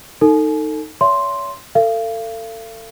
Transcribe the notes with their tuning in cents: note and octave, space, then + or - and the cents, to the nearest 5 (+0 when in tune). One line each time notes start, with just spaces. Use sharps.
D#4 +0 A4 +25 G#5 +35
C#5 +30 E5 +20 C6 +0
A4 +30 F5 -40